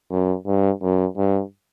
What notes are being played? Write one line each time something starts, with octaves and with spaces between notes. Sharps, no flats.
F#2
G2
F#2
G2